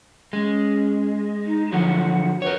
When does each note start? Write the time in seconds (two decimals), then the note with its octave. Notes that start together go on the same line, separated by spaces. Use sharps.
0.33 G#3 C#4
1.46 D#4
1.72 D3 F3 F#3 F#5
2.42 A#4 B4 C#5